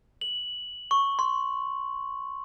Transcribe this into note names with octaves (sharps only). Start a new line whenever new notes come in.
F#7
C#6
C6